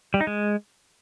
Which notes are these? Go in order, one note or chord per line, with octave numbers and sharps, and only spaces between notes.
G3
D#4
G#3